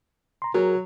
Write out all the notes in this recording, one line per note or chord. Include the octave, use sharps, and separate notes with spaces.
A#5 C6
F#3 F#4 G#4 A#4